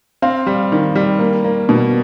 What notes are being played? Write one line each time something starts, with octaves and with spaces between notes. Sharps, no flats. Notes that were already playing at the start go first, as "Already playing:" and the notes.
C4 F5
G3
D#3
G3
A#3
A#3
B2